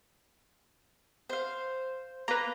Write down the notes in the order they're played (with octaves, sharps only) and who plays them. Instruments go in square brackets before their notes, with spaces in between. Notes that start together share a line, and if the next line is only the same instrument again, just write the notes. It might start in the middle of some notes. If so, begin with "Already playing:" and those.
[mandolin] C5 F5
[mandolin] A#3 [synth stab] B4 A#5